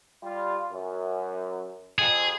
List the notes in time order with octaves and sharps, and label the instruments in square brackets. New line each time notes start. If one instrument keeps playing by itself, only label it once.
[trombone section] G3 F4
F#2
[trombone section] F2 [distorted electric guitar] G#4